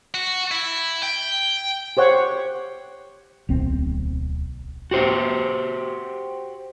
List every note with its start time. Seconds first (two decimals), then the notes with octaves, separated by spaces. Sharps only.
0.14 F#4
0.51 E4
1.03 G5
1.97 G4 C5 C#5 F#5
3.49 D1 B1 C4
4.91 F#4 G4 C5